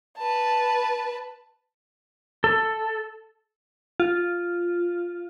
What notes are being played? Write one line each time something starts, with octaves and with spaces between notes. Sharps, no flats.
B4 A5
A4
F4